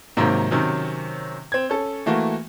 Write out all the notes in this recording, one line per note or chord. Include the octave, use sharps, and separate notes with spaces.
G#2 C3 D#3 F#3 A#3
C3 D#3 F#3 C#4
C4 G#6
C#4 A4
E3 A3 A#3 F#4